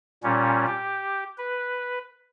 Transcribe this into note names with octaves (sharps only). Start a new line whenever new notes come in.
A#2 G3 C#4
G4
B4